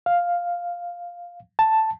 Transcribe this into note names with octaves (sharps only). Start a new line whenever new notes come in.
F5
A5